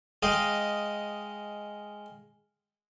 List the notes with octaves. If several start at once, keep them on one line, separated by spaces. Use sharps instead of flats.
G#3 D#5 F5 G5